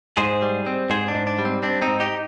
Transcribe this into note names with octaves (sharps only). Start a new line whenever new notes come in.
G#2 G#4 C5
G3
C4
G#2 G#4 C5
D4
G#2
D4
G3
C4
C4 D4
C4 D#4
G#2
D#4 G4